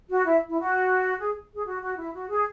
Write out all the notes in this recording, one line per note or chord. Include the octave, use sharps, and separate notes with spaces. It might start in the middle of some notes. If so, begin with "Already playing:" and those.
F#4
E4
E4
F#4
G#4
G#4
F#4
F#4
E4
F#4
G#4